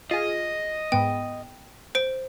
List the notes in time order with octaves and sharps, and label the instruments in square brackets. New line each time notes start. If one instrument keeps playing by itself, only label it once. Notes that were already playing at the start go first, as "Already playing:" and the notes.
[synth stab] F4 G#4 [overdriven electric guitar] D#5
[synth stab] G#2 B3 [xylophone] G5
[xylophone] C5 D7